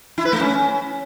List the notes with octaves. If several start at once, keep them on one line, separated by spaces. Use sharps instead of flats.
E4
B4
A3
C#4